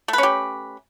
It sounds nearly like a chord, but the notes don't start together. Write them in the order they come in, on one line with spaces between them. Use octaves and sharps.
A3 B4 C#4 G4